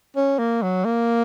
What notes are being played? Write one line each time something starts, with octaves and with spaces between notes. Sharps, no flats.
C#4
A#3
F#3
A#3